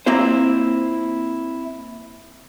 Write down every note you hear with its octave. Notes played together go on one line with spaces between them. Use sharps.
A#3 C4 E4 F4 C5